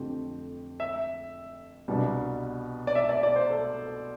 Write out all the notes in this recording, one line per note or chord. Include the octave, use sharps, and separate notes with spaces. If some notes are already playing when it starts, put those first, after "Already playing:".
Already playing: F2 D3 A3 C4 G4
E5
C2 B2 G3 D4
D5
E5
D5
D5
C5
A4